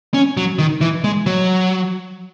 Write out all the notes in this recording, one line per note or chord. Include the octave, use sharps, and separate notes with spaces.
C#4
F#3
D#3
E3
G#3
F#3